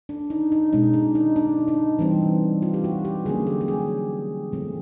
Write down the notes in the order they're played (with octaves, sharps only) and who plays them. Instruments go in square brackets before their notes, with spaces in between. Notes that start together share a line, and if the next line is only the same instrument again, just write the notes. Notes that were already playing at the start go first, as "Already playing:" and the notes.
[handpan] D4
D#4
D#4
B2 G#3 C#4 D#4
D4
D#4
D4
D#4
E3 G3 C4
F4
G4
F#4
G4
D3 F#3 A#3 C#4 G#4
G4
G4
G#4
C#3 F3 A3 C4